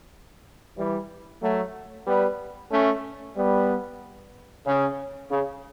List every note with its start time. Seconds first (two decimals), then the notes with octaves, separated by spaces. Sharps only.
0.77 E3 G3
1.42 F#3 A3
2.07 G3 B3
2.71 A3 C#4
3.36 G3 B3
4.66 C#3
5.31 C#3